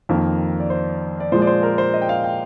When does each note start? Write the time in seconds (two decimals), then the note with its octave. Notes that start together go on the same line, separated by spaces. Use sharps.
0.09 F2 D#3 A#3
0.60 D5
0.70 C5
1.20 D5
1.32 A#2 F3 G#3 C5
1.42 D5
1.47 C5
1.63 A#4
1.78 C5
1.94 D#5
2.02 G5
2.09 F5
2.24 G5